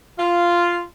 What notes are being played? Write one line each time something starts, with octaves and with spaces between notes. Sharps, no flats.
F4